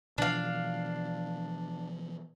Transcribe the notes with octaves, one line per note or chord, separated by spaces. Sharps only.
B2 E3 F3 D4 F5